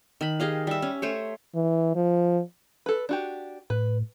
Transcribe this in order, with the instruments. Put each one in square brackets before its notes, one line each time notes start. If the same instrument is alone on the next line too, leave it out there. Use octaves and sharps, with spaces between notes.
[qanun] D#3 B5
G4 G#4 D#5 F5
G3 E5
C#4
A3 C5 C#5
[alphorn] E3
F3
[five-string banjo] A4 B4
D4 F#4 G4
[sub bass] A2 [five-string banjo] B4